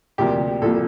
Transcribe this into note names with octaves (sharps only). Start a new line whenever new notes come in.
D2 C3 F3 A#3 G4
C2 A#2 F3 A#3 A4